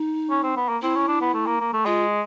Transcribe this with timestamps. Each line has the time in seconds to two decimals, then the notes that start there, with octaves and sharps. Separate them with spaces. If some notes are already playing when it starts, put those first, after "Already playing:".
Already playing: D#4
0.30 C#4
0.43 C4
0.57 B3
0.69 A#3
0.82 C4 E4
0.96 C#4
1.08 D4
1.21 B3
1.34 A3
1.47 A#3
1.60 A#3
1.73 A3
1.86 G#3 F4